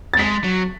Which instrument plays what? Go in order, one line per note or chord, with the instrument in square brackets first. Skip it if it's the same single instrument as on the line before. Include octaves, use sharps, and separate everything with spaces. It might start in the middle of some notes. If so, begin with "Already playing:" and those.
[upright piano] A6
[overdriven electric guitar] G#3 [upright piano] B6
[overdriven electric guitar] F#3